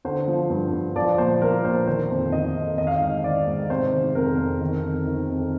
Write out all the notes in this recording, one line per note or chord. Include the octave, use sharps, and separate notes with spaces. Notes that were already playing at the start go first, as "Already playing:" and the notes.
D3 C5
F3
G2
G2
F3 D5
A#2 C5
F3 A#4
A#2 C5
D#3 C5
F2
D#3 D#5
F2
D#3 D#5
F5
D#5
G#2
D#3 D5
G#2
C3 C5
D#3
F2 A#4
F2
D#3
F2
D#3
F2